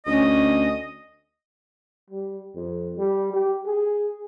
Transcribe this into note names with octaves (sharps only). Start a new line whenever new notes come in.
D2 C#4 D#5
G3
F2
G3
G4
G#4